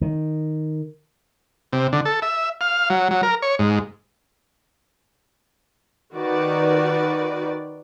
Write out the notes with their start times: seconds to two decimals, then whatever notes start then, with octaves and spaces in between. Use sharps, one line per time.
0.01 D#3
1.73 C3
1.93 D3
2.05 A4
2.22 E5
2.61 F5
2.90 F#3
3.11 F#3
3.23 A#4
3.42 C#5
3.59 G#2
6.14 D#3 F#4 B4 D5